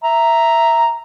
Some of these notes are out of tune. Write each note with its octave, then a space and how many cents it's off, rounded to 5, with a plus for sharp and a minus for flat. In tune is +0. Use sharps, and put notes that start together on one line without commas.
E5 +0 A#5 +0